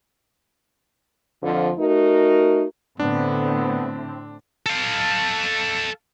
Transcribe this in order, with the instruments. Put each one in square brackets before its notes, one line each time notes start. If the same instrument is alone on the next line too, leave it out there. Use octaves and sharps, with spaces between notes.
[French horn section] F2 D3 F3
A3 D#4 F#4 A#4
[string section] A2 D3 C4 [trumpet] B3 [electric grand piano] D4
[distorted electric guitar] A4 F5